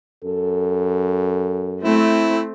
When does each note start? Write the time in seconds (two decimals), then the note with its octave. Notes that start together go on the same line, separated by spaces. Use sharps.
0.24 F#2 A4
1.83 A3 C4 E4